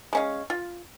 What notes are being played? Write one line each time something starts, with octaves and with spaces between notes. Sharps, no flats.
G#3 C#4 F5
F4